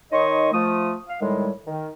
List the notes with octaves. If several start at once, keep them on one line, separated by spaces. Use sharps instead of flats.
D#3 D#4 C#5 D#5 C6 C#6
F3 A3 D#6
F5
A2 D#3 G3 G#3
D#3